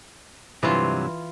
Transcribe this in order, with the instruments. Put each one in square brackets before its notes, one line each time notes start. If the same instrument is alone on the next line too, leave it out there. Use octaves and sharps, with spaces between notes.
[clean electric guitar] G2 C3 F#3 [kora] E3 F4